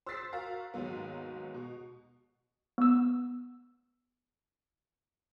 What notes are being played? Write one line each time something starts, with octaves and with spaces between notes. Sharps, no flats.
C5 E6 F#6 A6 B6 C7
F#4 A#4 F5
D#2 G#2 F#3 B3
B2
B3 E6